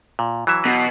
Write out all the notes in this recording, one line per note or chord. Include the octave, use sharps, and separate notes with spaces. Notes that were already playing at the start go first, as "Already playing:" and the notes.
A#2
E3 F#3 E5
B2